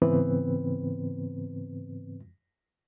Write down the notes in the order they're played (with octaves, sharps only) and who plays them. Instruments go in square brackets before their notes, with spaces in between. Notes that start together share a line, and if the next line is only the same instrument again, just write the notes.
[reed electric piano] G#2 C#3 E3 B3 C4 B4